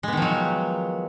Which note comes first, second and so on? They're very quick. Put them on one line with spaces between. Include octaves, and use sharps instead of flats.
G#3 B3 D#3 F3 F#3